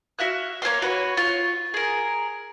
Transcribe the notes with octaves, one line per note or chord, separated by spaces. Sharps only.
F#4 E5 F5 F#6
A#3 C#5 F5 C6
F#4 B4 C#5
F4 C#5
G#4 A#4